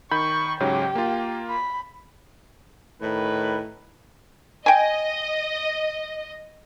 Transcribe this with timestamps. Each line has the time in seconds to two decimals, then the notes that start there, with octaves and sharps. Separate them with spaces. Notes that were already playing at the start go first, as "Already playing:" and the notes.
0.11 D#3 B5 C#6 G6
0.60 G#2 C#3 F#3 G4
0.95 A#3 F4
1.50 B5
3.02 A2 D#3 B4
4.66 D#5 G5 G#5